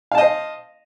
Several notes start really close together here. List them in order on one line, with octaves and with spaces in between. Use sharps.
F5 A5 D#5 C5